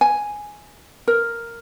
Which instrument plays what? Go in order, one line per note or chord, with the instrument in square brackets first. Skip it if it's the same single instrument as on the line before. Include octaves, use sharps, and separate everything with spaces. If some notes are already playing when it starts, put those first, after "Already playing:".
[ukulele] G#5
A#4